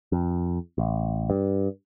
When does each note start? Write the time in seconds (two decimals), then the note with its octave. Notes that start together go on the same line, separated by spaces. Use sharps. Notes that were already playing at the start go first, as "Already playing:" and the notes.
0.12 F2
0.78 A1
1.30 G2